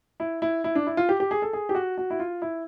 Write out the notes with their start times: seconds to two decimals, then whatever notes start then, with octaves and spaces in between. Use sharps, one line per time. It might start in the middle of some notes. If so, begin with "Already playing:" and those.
0.20 E4
0.42 E4
0.64 E4
0.75 D4
0.87 E4
0.97 F4
1.09 G4
1.20 G4
1.31 G#4
1.42 A4
1.53 G#4
1.69 G4
1.75 F#4
1.98 F#4
2.10 E4
2.20 F4
2.42 E4